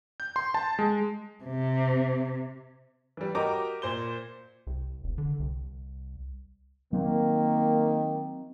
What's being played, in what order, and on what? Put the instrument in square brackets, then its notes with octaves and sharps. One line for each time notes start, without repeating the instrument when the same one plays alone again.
[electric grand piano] G6
C6
A5
G#3
[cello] C3
[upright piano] E3 G3
F#4 G4 A#4 D#5 A#5 D6
A#2 C5 C6 G6 G7
[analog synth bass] C2
E1
D3
C2
[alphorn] D#3 [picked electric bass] F#3 C4 [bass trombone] A#3